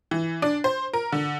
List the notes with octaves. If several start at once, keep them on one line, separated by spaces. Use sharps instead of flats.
E3
D4
C5
A#4
D3